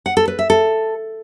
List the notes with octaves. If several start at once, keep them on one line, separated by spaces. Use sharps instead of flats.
F#5
A4
B4
E5
A4